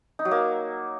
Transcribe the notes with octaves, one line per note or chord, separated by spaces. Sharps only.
D#4
F#3
A#3